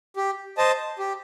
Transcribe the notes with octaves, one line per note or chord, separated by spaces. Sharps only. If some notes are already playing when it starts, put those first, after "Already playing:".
G4
C5 D#5 A5
G4